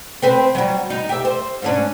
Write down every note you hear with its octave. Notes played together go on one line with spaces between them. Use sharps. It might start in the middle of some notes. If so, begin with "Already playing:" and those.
C4 B4 C5
F#3 G3
D#4
G4 E5
C5
G#2 C#4 D4